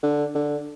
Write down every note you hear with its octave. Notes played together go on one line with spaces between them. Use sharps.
D3
D3